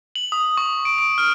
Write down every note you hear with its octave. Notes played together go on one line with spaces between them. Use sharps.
F#7
D#6
C#6
D7
D7
F6